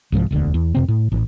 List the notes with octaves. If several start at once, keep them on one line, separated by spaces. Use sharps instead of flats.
C2 G#2 E3 F3
E1 D2 D3
E2
F2 C3 C4
A2
A1